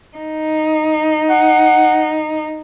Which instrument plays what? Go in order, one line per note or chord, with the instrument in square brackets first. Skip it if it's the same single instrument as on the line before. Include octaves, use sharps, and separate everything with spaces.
[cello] D#4
[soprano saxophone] F#5